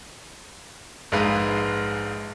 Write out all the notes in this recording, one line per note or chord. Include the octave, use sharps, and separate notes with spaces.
A#1 G#2 G#3 B4 F5 F6